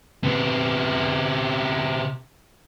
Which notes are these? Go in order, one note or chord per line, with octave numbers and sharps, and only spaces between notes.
C3 B3